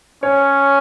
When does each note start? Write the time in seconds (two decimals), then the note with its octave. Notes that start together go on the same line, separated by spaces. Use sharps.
0.23 C#4 C#5